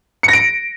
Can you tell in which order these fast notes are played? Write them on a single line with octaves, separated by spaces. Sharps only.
C#7 A#6 D7